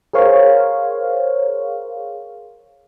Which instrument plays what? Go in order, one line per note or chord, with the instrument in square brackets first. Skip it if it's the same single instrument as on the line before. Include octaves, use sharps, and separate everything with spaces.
[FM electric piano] G#4 A#4 C5 C#5 F5